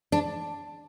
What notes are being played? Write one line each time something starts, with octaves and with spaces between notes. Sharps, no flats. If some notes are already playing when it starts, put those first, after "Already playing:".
D4